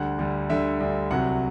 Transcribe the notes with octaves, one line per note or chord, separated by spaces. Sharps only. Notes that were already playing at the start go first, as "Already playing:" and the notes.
Already playing: D2 D3 G3 F#5
D2 D3 G3
D2 D3 G3 E5
D2 D3 G3
C2 C3 F#3 F#5